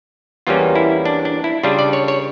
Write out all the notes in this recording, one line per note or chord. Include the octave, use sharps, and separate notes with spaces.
E2 E3 G3 A#3 C#4 F4
E4
D4
D4
E4
C#3 G3 D4 F4
D5
C#5
C#5